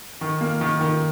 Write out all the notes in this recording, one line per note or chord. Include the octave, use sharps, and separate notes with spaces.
D#3
A#3
D#3
D#3